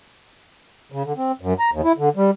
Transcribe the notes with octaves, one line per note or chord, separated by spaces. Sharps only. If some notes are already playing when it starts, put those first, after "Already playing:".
C#3
D3
C4
F#2
A#5
D#2
E4
D3
G3